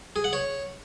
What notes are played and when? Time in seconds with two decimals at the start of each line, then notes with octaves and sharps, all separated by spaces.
0.16 G#4
0.24 F#5
0.33 C#5